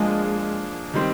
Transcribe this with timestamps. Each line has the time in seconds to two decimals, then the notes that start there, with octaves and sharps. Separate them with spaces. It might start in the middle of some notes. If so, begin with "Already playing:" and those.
Already playing: F3 G#3 A#3 D4 F4 G#4
0.94 D#3 G3 C4